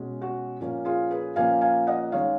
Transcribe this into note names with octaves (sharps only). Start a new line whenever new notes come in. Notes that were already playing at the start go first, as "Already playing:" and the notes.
Already playing: B2 G#3 C#4
F#4
A#2 F3 A#3 C#4
F4 G#4
G#4 B4
A#2 F3 A#3 C#4 F5 G#5
F5 G#5
D#5 F#5
D#3 G#3 C#4 C#5 F5